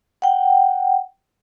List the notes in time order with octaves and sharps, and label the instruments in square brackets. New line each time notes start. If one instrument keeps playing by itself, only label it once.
[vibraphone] F#5 G5